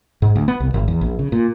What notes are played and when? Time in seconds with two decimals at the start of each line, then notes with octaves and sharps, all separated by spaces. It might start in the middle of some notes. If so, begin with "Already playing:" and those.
0.22 G#2
0.36 D2
0.48 B3
0.60 C2
0.74 G#1
0.88 E2
1.01 A#1
1.19 C#3
1.32 A#2